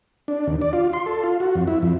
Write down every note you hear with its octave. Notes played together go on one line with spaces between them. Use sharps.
D4
D#2
D5
F4
C6
A4
F4
F#4
F2
E4
F2